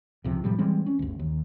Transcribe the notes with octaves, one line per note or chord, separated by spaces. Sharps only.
C#2 C3 F3
A2 C3 F3 G3
E3 G3 G#3 C4
C#4
G1 D2
D#2